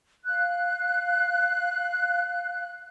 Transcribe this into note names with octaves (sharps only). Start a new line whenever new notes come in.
F5 F#6